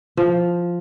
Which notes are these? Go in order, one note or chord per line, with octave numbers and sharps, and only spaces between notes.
F3